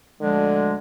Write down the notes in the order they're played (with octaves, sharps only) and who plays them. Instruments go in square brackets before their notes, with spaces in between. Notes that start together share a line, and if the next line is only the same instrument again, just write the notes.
[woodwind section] D2 F3 G#3 [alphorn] D3